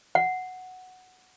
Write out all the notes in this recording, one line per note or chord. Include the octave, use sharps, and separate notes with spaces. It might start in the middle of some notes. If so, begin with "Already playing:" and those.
F#5